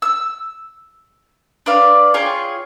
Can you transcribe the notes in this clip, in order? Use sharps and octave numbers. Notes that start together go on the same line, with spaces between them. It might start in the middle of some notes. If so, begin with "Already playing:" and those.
E6
D4 B4 D5 F5
F4 G#4 C#5 G5